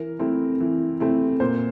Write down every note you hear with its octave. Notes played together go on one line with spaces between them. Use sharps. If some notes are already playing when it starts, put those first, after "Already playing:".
Already playing: E3 A#4
A3 C4 E4
E3
A3 C4 E4
A#2 C5